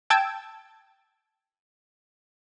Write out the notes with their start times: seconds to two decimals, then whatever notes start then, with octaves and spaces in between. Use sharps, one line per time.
0.10 G5 A5 E6 G#6 D7